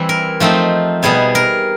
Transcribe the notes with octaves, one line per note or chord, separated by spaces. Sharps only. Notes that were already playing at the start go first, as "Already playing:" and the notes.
Already playing: E3 G3 C4 E4
A#4
F3 A3 C4 D#4
B2 G3 B3 G#4
A#4